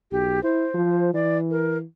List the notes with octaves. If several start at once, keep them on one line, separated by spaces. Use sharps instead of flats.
B1 G4
E4 C5
F3
E3 D5
A#4